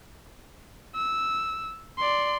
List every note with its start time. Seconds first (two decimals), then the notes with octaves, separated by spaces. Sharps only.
0.95 E6
1.97 D5 C6